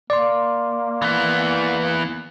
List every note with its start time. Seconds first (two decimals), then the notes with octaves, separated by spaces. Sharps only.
0.10 A#3 D5 C6
1.02 E3 B3